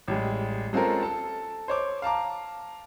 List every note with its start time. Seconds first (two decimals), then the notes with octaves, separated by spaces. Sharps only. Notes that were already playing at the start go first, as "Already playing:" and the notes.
0.08 A1 G3 G#3
0.73 G#3 C4 C#4 F4 A4 A#4
1.03 A4 A5
1.68 C5 C#5 D6
2.02 F5 A5 A#5 D6